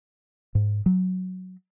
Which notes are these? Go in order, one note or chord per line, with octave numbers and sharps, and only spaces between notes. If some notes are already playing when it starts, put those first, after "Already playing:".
G#2
F#3